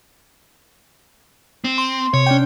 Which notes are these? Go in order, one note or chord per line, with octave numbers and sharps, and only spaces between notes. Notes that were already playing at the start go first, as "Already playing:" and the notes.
C4
C6
C3 C#5
C#4 D4 G5